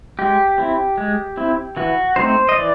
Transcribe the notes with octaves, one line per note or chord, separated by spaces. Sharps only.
G#3 G4
C4 E4
G#3
C4 E4
E3 F#4
A3 C4 D#4 C5
D#5
E3 D5